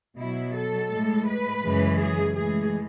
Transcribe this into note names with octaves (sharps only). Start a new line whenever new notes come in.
B2 F#3 E4
A4
A2 G#3
B4
F#2 C#3 E3 G#3
G#4
A2 E3 G#3 G#4